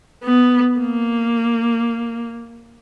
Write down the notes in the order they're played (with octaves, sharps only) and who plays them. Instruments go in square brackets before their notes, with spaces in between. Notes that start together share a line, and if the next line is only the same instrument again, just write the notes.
[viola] B3
A#3